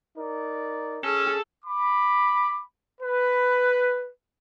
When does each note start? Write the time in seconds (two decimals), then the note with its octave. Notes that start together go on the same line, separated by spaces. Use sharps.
0.18 D#4 A#4 D5
1.05 C#4 G#4 A4
1.65 B5 D6
3.01 B4